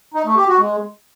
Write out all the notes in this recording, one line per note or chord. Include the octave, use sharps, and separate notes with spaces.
D#4
A3
G4
F#4
G#3